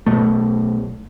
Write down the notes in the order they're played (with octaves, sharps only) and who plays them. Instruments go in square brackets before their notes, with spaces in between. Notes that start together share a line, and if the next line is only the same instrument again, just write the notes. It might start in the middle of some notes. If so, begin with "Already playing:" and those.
[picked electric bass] B1 B2 A3